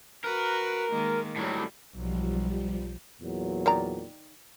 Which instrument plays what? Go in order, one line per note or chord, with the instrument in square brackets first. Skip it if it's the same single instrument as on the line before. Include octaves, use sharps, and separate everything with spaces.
[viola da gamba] F#4 B4 [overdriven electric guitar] A#4
[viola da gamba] D#3 G#3 A#3
[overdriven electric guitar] A2 F#3 [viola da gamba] G3
[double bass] B1 [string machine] F3 G3
[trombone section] E2 A#2 F#3
[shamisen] D#3 D5 A#5